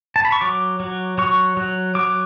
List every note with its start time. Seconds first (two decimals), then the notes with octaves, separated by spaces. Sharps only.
0.16 A5
0.25 B5
0.32 C#6
0.41 F#3 D6
0.80 F#3
1.18 F#3 C#6
1.57 F#3
1.95 F#3 D6